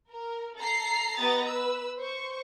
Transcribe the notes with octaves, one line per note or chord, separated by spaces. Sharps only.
A#4
A4 A#5 C7
B3 G4 D#5 A#5 A6
B4 E6
C5 C#6